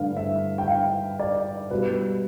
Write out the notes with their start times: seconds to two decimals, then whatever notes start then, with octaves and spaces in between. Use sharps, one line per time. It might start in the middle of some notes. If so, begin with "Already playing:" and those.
Already playing: G2 D3 A3 F5
0.17 E5
0.58 G5
0.68 F5
1.20 D5
1.70 B2 G3 B4